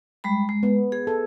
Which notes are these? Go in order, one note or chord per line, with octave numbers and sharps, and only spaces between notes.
G3 G#3 B5
G#3
B3
G#4
A4